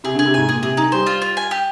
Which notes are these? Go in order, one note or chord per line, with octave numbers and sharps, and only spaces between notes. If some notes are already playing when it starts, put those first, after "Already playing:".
C3 G#4
D3 G#4
C3
G#2 G#5
A#2 G#4
C3 G#4
D#3 D#4
G3 C5
F4
F4
G#5
G4